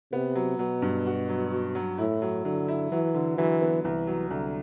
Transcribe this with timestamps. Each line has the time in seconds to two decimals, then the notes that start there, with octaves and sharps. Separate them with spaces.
0.13 C3 B3
0.35 F#3
0.59 B2 F#3
0.82 G2
1.06 F#4
1.29 F#3
1.51 F#4
1.75 F#3
1.98 A2 E4
2.22 F#3
2.45 D3 F#3
2.68 E4
2.92 E3 F#3
3.14 D3
3.38 E3 F#3
3.62 B3
3.84 C2 E3
4.07 F#3
4.31 C2 D3